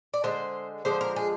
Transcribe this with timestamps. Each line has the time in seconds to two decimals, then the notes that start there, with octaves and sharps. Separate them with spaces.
0.14 D5
0.24 D3 G#3 C5
0.85 D3 F3 G#3 C5
1.01 A#4
1.16 G#4